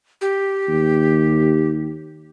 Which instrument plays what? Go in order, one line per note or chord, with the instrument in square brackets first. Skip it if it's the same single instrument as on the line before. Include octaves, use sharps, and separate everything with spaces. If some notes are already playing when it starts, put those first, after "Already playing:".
[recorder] G4
[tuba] D#2